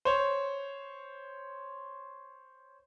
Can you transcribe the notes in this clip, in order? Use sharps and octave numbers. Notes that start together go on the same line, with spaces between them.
C5 C#5